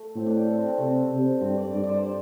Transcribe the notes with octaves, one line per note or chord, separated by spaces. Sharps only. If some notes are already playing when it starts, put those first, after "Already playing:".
Already playing: A3
A2 C4
D4
G4
A4
C4
D4
C4
C3 A3
C3
G2 C4
D5
G2 D5
D5
C5
C5